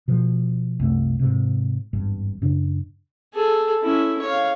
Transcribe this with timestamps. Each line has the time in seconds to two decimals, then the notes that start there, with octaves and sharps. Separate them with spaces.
0.08 B2 F3
0.80 C2 F#2 A3
1.19 G#2 C3
1.93 G#1 E2 G2
2.42 F#2 C#3 D4
3.34 G#4 A4
3.83 C#4 E4
4.22 C#5 F5